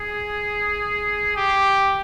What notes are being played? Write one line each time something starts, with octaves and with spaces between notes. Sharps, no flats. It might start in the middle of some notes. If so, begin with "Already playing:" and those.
Already playing: G#4
G4